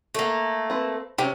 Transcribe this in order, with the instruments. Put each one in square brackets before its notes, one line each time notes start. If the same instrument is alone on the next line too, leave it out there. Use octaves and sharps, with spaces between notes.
[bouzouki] A3 A#3
[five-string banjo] C4 B4
[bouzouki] C3 [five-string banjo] C#4 G4